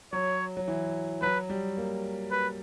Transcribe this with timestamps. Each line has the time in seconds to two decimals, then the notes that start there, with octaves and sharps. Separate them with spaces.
0.12 F#3 C#5
0.57 F#3
0.68 E3
1.22 F#3 B4
1.49 G3
1.77 A#3
2.31 B4